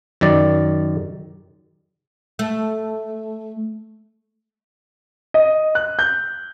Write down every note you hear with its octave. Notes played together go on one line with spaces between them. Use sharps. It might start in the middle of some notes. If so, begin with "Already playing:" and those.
F#2 D#3 D5
A3
D#5
F#6
G6